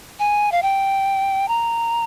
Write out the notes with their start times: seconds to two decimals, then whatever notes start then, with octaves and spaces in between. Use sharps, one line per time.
0.19 G#5
0.52 F5
0.62 G5
1.48 A#5